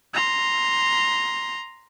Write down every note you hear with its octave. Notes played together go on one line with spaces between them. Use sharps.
A#5 C6